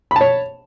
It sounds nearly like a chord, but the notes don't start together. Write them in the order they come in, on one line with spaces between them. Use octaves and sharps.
B5 A5 C#5